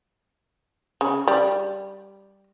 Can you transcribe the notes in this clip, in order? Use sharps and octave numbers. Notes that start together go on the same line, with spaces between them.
C#3
G3